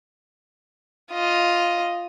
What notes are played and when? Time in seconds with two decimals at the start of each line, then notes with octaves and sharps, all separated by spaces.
1.12 F4 D#5